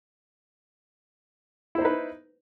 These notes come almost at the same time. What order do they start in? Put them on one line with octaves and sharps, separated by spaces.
E4 C5 D#4 B4